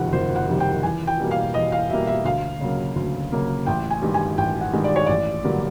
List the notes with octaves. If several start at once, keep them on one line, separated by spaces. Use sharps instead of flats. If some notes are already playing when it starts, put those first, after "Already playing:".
Already playing: F#1 F2 C3 D#3 G3 F#5
F#1 C5
F#5
F2 C3 D#3 G3
G5
E2 G#5
G5
B2 G3 A#3
F5
E2 D#5
F5
B2 G3 A#3 E5
E5
D2 F5
C#3 F#3 A#3
D2
C#3 F#3 A#3
A1 G5
G#5
G2 D#3 G#3
G#5
A1 G5
F#5
G2 D#3 G#3
D5
C#5
A1 D5
G2 D3 F#3 A#3